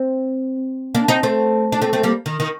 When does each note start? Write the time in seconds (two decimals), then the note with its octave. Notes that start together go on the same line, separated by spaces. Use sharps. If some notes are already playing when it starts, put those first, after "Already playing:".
Already playing: C4
0.95 A#3 D4
1.08 C4 D#4
1.23 A3 C4
1.72 D4
1.82 A3 C4
1.93 A3 C4
2.03 G3 A#3
2.26 D#3
2.40 D#3